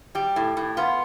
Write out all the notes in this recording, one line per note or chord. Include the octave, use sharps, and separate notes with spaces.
G3 G4
A2
A2
B3 F4